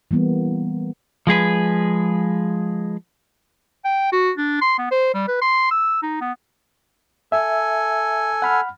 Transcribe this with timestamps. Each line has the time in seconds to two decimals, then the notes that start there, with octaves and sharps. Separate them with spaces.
0.11 E3 G3 A#3 B3
1.27 F3 G#3 G#4 B4
3.84 G5
4.12 F#4
4.37 D4
4.61 C6
4.79 B3
4.91 C5
5.14 G3
5.28 B4
5.41 C6
5.71 E6
6.03 D#4
6.21 B3
7.32 A4 E5 G#5
8.42 F#5 B5 F6